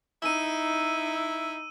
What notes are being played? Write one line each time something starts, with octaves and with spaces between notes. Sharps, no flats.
D#4 E4 E6 D#7